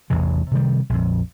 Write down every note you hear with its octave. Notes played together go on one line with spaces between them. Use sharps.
A1 E2 C3 E3
C3 D#3 G3
A#1 F2